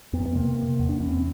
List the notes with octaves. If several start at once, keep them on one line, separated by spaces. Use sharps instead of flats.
F2 B3
B3
C3 A#3
C3
E2
D4
E2 C#4
C4